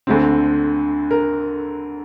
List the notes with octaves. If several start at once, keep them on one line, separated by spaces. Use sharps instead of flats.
D2 D3 A3 C4
A#4